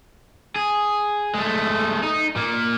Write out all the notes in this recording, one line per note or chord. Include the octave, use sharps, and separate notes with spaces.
G#4
G#3 A3
D#4
A#2 A#3